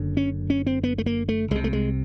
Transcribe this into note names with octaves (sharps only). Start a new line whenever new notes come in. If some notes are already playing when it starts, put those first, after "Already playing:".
Already playing: F#1 F#2 D3
C#4
C#4
C4
B3
A3
A#3
A3
C2 C3 G#3
A3
G#3